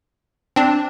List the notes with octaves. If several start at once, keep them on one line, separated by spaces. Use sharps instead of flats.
C4 D4